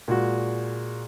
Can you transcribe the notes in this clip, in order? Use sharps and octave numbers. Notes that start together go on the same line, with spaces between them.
A#2 G#3 F#4